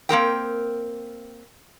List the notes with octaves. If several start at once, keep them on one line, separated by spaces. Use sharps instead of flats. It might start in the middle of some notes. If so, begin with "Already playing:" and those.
A#3 C4 A#4 G5